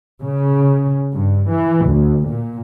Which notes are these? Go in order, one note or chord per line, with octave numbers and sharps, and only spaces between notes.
C#3
G2
E3
D2
A#2